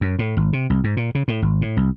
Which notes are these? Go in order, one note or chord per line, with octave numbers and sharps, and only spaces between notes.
F#2
A2
G#1
C3
C2
G#2
A#2
C#3
A2
G#1
A2
C2